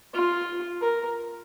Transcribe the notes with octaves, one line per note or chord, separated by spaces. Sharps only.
F4
A#4